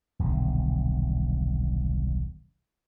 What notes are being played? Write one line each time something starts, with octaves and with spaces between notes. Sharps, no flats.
D#1 B1 D3